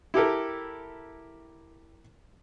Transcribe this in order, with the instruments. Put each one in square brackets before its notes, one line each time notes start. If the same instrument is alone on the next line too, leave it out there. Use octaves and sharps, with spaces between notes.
[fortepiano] E4 G4 A4 A#4